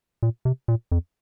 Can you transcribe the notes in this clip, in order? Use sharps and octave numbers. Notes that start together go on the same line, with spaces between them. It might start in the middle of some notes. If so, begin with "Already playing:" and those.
A#2
C3
A#2
F2